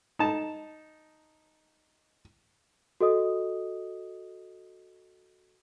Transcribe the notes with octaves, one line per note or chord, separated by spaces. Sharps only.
D#4 A5
F#4 A4 D#5 D#6